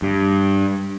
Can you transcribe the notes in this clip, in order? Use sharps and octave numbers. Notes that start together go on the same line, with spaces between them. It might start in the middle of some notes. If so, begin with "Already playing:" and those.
G2